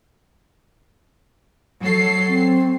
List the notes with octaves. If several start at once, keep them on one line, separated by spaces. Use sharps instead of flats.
F#3 A4 C7
C4